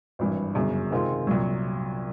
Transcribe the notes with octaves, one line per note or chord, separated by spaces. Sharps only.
G#1 G2 E3
G1 F#2 C#3
C3 D#3 G#3 C4 F4
C2 A#2 F#3